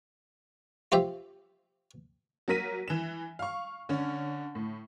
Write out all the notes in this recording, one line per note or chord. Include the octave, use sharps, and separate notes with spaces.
F4 G4 C5 E5
F#3 A#3 A#4 A#6 B6 D#7
E3 E7
F5 C#6
D3 C#4
A2